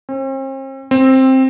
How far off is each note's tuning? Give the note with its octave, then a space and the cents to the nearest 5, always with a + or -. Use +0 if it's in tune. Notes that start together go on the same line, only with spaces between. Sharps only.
C4 +45
C4 +10